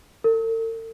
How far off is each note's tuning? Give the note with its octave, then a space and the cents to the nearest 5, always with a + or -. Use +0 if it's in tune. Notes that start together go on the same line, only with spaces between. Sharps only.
A4 +45